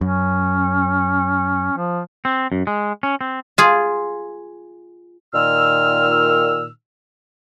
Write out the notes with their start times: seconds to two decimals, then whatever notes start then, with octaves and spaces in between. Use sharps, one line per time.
0.01 F#2 C#4
1.77 F3
2.25 C4
2.52 F#2
2.67 G#3
3.03 C#4
3.21 C4
3.58 F4 G#4
5.34 A#2 D#3 E6 F6